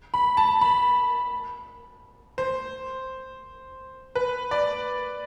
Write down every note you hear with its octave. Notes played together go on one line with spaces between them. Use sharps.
B5
A5
B5
C5
B4
D5